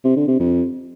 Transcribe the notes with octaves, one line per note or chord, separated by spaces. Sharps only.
C3
D3
C3
F2